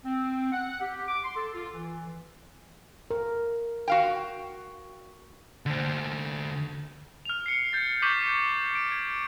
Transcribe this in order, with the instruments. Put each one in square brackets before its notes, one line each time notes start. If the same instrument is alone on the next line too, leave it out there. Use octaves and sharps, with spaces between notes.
[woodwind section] C4
F#5
G4
D6
C6
A4
F4
E3
[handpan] A#4
[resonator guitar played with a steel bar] F#4 F5 G5
[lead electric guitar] D3 C5
[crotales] F6 F7
C7 C#7
G6 A6
C#6 D6 G6 B6 D#7 F#7
D7
G#6